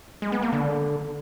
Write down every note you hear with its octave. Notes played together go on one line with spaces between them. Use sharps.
G#3
B3
A#3
D3